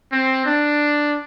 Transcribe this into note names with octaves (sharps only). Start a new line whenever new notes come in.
C4
D4